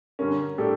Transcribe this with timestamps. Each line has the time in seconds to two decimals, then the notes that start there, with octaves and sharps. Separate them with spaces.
0.19 G2 D3 G3 C#4 A#4
0.58 A2 G3 D4 G4 A4